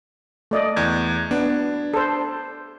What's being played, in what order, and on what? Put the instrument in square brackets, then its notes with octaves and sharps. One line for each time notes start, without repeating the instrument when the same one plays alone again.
[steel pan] A3 D5 D#5
[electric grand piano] E2 G#6
[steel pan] B3 [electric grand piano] D4
[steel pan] A4 C5